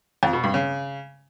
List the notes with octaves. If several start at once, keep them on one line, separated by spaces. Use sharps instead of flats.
F2
B2
G2
C#3